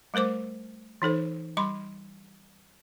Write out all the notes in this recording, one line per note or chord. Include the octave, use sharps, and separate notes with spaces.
G3 A3 A#4 C5 D6
E3 D#4 A4 C5
G3 B5 C6